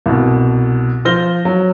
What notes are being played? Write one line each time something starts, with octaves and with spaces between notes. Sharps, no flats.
C2 B2
F3 C5 F6 A#6 G7
F#3